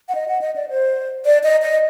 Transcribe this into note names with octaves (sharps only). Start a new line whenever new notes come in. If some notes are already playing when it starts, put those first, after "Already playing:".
F#5
D#5
F#5
D#5
D5
C5
D5
D#5
D#5